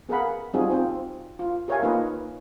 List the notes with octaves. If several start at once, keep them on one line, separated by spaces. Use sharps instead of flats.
B3 G#4 A#4 F5 F#5 B5
G3 C4 D#4 F4 F#4 G#4
C4 F4 C5
F4
G4 A#4 C#5 E5 F5 G#5
A#3 D#4 F4 B4 C#5 D#5